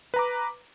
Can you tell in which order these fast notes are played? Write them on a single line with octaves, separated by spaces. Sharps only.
B4 A#5 D6